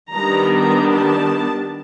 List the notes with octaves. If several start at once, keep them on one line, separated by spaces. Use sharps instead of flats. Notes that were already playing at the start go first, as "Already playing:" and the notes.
D#3 G3 B3 D4 A#5
A#5
A5